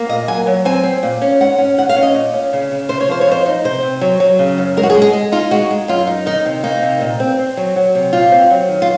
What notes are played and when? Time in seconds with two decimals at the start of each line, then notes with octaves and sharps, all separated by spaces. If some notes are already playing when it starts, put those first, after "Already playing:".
Already playing: A#3
0.09 A#2 D#5
0.28 F#3 G#5
0.47 F#3
0.65 C4 G#5
0.84 C4
1.03 A#2
1.21 C#4
1.41 G#2 F#5
1.58 C#4
1.78 D#2 F#5
1.89 F5
1.96 C#4
2.03 D#5
2.14 A#2
2.34 C#4
2.53 C#3
2.72 C#3
2.89 C3 C5
3.01 C#5
3.09 F3 C5
3.21 C#5
3.28 F2 C5
3.46 D#4
3.64 C3 C5
3.83 C3
4.01 F#3
4.20 F#3
4.39 C#3
4.58 F#2
4.77 G#3 A#4
4.83 F#4
4.90 G#4
4.95 G#3
5.02 G#4
5.13 G#3
5.32 D#4 F4
5.51 G#3 F#4
5.71 G#3
5.88 F#2 F4
6.07 D#4
6.26 D#3 D#4
6.45 C3
6.63 A#3 D#4
6.82 C3
7.01 A#2
7.20 C4
7.39 C4
7.57 F#3
7.76 F#3
7.95 C3
8.13 A#2 F4
8.32 C4
8.51 F#3
8.69 D#3
8.82 F4